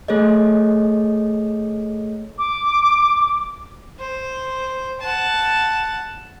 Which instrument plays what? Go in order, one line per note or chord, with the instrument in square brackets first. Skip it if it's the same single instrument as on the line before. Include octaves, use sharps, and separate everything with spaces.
[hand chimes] A3 G#4 A4 C#5 D#5
[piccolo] D6
[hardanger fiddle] C5
F#5 A5